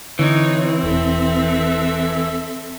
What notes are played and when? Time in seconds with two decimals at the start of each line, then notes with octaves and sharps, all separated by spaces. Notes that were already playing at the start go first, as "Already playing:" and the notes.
0.19 D3 E3 C4 D#4 C#5
0.83 E1 A4 E5